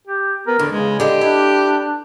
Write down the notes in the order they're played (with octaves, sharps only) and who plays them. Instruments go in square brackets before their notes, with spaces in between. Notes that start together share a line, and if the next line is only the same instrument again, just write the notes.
[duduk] G4
[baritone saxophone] B3 [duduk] A#4
[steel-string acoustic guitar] E2 [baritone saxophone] D3
[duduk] C#3 [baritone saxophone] G#3
[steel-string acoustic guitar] D3 G#3 [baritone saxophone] G4
[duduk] D4 [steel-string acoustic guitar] E4